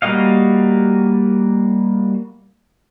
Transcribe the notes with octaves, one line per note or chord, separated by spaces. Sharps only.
G3 A#3 F#4 D#5 F5